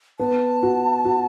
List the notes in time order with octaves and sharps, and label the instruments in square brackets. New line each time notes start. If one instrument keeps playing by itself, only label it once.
[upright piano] B3 [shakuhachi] A5
[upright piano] F#4
F#4